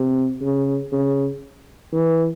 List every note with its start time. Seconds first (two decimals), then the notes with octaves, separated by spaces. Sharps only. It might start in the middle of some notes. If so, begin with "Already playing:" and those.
Already playing: C3
0.42 C#3
0.92 C#3
1.93 E3